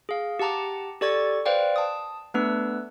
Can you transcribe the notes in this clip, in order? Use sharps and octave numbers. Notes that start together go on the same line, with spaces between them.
G#4 F5
G4 F#5 A5 A#5 D6
G4 A4 D5 C#6 G#6 A6
B4 C5 D5 F5 G5
A5 D#6
A3 B3 D4 B4 E6